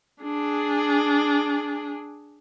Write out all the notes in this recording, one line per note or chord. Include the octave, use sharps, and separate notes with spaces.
D4 G#4